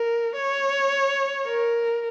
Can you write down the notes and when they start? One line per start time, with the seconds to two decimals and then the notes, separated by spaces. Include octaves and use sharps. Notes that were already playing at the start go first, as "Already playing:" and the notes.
Already playing: A#4
0.36 C#5
1.48 A#4